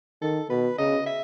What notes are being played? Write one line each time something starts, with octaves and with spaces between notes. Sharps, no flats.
D#3 A4
B2 B4
C#3 D#5
E5